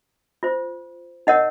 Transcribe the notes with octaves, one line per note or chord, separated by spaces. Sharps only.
F4 C5
D#4 A#4 C#5 D#5 F#5